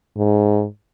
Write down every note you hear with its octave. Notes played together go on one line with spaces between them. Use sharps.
G#2